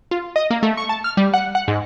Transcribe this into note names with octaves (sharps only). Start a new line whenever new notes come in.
F4
D#5
A#3
A3
C#6
A5
F6
G3
F#5
F#5
G#2